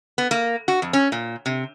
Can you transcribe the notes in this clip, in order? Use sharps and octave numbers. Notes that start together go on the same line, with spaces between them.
B3
A#3
F#4
F2
C#4
A#2
C3